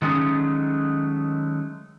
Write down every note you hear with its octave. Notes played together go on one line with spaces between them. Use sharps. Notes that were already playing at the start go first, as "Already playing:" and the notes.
D#3 F#3 G#3 A3 C#4 D#4